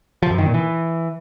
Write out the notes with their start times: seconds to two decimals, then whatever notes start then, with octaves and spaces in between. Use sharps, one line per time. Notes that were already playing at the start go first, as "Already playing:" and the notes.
0.23 F3
0.30 F#2
0.38 D#3
0.46 A#2
0.54 E3